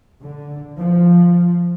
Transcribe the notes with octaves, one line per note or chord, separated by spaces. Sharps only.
D3
F3